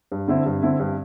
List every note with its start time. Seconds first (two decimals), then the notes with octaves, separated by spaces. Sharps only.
0.12 G2
0.28 D3 C4 E4
0.46 G2
0.62 D3 C4 E4
0.79 G2